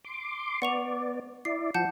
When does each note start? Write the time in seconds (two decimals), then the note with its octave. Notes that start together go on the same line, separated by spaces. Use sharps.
0.05 C6 D6
0.62 B3 D5 F#5 C#6 F7
1.45 E4 D5 C7
1.74 F3 F#5 A5 G6